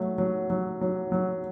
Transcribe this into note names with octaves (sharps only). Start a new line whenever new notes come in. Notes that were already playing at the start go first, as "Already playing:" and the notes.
Already playing: F#3 A3
F#3
F#3
F#3
F#3